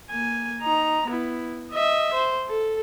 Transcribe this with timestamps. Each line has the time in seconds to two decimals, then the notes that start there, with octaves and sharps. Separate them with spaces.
0.10 A#3 G#5
0.61 D#4 A#5
1.08 B3 E4
1.72 D#5 E5
2.14 C5
2.49 A4